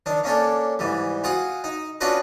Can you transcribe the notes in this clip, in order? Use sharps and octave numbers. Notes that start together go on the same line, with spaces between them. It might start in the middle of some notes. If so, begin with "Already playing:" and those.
D#3 D4
A#3 C#4 D4 A4
G#2 E3 G3
F4 F#4 G#4 F#5
D#4
C#4 D4 F4 F#4 B4 D#5